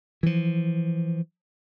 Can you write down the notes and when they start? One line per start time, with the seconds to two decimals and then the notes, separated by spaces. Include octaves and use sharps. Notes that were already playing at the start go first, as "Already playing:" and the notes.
0.23 E3 F3